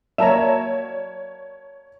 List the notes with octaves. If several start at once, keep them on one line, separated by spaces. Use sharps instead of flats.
F#3 A#3 C#5 D5 E5 A5 A#5 E7